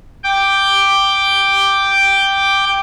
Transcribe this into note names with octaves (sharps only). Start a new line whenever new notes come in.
G5 D6